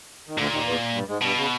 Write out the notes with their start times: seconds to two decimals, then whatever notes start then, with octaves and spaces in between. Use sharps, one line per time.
0.27 D#3
0.37 D2 A#2 D3
0.51 D#2 D#3
0.66 E2 E3
0.94 G2 G3
1.08 G#2 G#3
1.22 G2 B2 G3
1.36 C#3